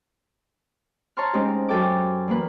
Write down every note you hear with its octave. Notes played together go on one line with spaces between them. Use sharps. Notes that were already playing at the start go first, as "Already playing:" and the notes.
C#5 A5 A#5 C6 C#6 F6
G#3 C4 C#4 D#4 G4
F#2 A4 G5 D6
E2 A#3 B4